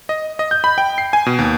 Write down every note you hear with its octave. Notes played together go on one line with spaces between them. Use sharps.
D#5
D#5
G6
B5
G5
C7
G#5
B2
D#2